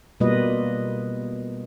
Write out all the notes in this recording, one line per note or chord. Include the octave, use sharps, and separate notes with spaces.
B2 G3 A#3 F4 B4 D#5